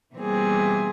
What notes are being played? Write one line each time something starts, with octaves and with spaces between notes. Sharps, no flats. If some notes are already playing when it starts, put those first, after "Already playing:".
B2 E3 G3 A#3 C4 G#4